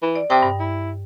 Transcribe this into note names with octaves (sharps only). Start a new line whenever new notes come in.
E3
D5
C3 G5 D#6
G2
E4